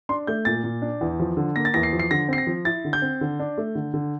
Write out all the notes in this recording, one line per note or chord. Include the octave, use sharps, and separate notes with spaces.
D4 C6
A3 G6
A#2 A6
A#2
D4
E2
F3
D3
A#3 A#6
A6
E2 A#6
C7
F3
C7
D3 A#6
C4 C7
A#6
F3
E4 A6
D3
G6
C4
D3
D4
A3
D3
D3